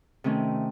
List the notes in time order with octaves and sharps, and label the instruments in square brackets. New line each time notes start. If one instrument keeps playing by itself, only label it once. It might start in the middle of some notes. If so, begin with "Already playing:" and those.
[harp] C3 D#3 A3 C#4